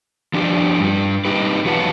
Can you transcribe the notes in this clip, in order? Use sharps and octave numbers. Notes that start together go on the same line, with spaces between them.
F3 D4 G4
G2 G3
D#4 G4 B4
E2 F#3 F4 B4 F#5 A5